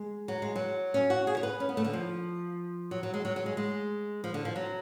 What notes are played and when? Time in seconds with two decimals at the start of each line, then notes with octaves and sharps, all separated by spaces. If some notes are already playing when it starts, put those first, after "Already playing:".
Already playing: G#3
0.28 F#3
0.42 G#3
0.56 F#3
0.94 C#4
1.10 F#4
1.27 G#4
1.37 C#5
1.43 B4
1.60 C#4
1.69 B3
1.77 A3
1.84 D3
1.93 F3
2.91 F#3
3.03 F#3
3.14 G#3
3.25 F#3
3.36 F#3
3.46 G#3
3.57 G#3
4.24 F3
4.34 D3
4.45 F3
4.56 F#3